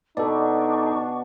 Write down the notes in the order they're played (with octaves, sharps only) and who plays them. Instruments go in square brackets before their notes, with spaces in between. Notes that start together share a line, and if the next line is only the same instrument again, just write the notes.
[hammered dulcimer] B2 [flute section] D4 C#6 [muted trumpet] D#4 [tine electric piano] A4 D5